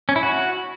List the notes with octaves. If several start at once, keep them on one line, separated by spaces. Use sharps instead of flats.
C#4
E4
F#4